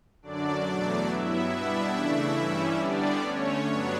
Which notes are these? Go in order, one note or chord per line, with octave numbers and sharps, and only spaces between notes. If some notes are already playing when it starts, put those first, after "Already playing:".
F#2 D3 F#3 D4 D5
E2 B2 F#3 A3
G2 F#3 B3 E4 E5
B2 G3 B3 D4 E4 E5
C#3 E3 A3 D4
G2 E3 G3 C#4
D3 G3 B3 D4 D5
D3 A3 C#4 C#5
G2 F#3 B3 D4